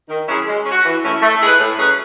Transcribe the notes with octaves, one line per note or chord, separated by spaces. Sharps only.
D#3
F#3 C#4 E4 G#4
G#3
C#4
F#4
E3
A3 C#4 E4
A3
E4 G#4 B4
A2
F#3 C#4 G#4 B4